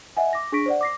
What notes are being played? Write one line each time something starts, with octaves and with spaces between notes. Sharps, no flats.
D#5 E5 F#5 G#5
D6 A#6
D4 G#4 C#6 A#6 B6 D7
C5 D5 F#5
D6 A#6 C7